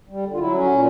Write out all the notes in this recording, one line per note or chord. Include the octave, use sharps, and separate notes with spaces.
G3
D3
F4
F#3 E4
C#4
A#2